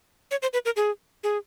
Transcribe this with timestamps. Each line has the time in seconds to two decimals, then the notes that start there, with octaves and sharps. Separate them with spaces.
0.31 C#5
0.42 C5
0.53 B4
0.65 A#4
0.76 G#4
1.24 G#4